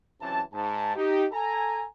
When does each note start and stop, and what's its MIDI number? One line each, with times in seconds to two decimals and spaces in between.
0.21 0.41 37
0.21 0.41 48
0.21 0.41 52
0.21 0.41 54
0.21 0.41 61
0.21 0.41 81
0.53 0.93 44
0.53 0.93 81
0.95 1.25 63
0.95 1.25 67
1.32 1.85 69
1.32 1.85 80
1.32 1.85 82